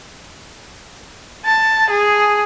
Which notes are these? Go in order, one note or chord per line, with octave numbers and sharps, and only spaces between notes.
A5
G#4